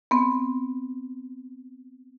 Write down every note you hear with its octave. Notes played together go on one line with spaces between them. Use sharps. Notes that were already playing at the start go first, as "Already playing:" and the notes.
B3 C4